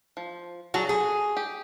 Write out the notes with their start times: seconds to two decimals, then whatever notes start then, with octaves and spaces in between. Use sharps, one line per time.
0.17 F3
0.74 F#3 F#4 G#4 A5
0.89 G#4 A4
1.37 G4